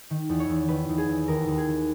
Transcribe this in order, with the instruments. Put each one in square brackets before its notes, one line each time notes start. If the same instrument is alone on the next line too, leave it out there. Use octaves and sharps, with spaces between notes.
[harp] D#3
E2
C#5
E2
D#3 B4
E2
G#4
E2
D#2 A#4
D#2
G#4
D#3